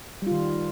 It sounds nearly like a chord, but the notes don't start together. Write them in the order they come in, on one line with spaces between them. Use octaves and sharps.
G3 F4 D#3